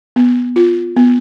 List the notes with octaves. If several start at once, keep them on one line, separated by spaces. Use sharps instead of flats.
B3
F4
B3